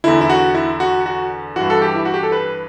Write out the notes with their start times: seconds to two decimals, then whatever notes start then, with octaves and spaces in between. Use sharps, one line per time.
0.04 E2 D3 E4
0.21 E4
0.30 F#4
0.55 E4
0.80 F#4
1.06 F#4
1.56 G2 E3 F#4
1.70 A4
1.82 G4
1.95 E4
2.05 F#4
2.14 G4
2.23 A4
2.32 B4